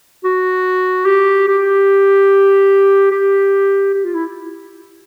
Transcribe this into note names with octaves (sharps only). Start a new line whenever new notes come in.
F#4
G4
G4
G4
G4
F4
E4